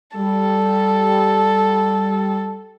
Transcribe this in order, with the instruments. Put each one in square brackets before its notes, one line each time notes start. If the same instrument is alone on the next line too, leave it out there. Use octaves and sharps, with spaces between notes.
[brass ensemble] G3 [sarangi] A4